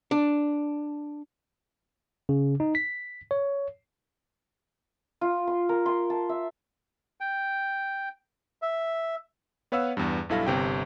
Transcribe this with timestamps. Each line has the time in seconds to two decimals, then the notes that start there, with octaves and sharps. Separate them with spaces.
0.11 D4
2.29 C#3
2.60 D#4
2.75 B6
3.31 C#5
5.21 F4
5.47 C6
5.69 A#4
5.86 C6
6.10 A5
6.29 E5
7.21 G5
8.62 E5
9.72 B3 B4 C#5 F5 F#5 E6
9.97 E2 G2
10.29 B1 G2 E4 A4 F5 A#6
10.47 G1 C3 G5